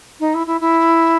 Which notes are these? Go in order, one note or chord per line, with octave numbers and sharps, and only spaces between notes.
D#4
E4
E4
E4